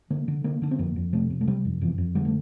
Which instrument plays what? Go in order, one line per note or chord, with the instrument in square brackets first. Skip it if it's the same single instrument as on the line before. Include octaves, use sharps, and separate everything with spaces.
[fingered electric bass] D3 A#3
D3
D3 A#3
D3 D4
C4
F2 A#3
F2
C3 A3
C3
A3
C3 G3
F2
F2 E3
F2
D3 G3
A3